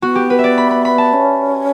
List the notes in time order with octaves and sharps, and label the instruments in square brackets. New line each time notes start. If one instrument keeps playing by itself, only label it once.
[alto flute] B3 [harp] F#4
[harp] G4
B4
E5
D5
B5
B5
B5
A5
[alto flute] C#4